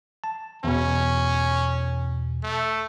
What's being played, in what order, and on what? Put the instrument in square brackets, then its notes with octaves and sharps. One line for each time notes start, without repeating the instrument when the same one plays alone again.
[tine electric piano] A5
[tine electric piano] E2 B2 [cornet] C#4
[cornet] A3